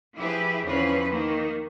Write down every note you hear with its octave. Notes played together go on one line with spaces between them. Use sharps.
F3 E4 G4 G#4 B4
E2 D3 E3 F3 C#4 B4
D#3 A#3